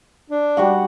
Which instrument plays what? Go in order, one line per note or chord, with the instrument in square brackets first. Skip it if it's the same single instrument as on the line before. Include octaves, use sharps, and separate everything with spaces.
[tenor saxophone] D4
[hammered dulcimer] G3 F#4 F#5